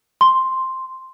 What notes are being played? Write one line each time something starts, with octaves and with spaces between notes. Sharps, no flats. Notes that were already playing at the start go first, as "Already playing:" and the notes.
C6